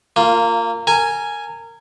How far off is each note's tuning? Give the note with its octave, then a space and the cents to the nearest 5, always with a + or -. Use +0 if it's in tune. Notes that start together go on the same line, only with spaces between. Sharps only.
A#3 -20 F4 +0
A#4 -25 G#5 +0